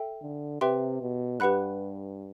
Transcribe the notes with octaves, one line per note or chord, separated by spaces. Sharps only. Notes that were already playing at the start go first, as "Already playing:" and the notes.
Already playing: A4 E5 G5
D3
C3 G4 B4 E5 G5 C6
B2
G2 G4 B4 F#5 B5 F#6